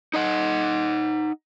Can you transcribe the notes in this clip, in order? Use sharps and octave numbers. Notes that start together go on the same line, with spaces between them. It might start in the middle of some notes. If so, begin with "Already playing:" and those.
D#4 D#5 F#5